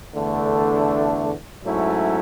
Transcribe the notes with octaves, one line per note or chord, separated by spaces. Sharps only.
E2 D3 A3 D4
G#2 F#3 A3 C#4 E4